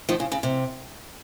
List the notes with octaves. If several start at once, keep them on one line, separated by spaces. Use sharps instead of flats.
D#3 F3
C#3
C#3
C3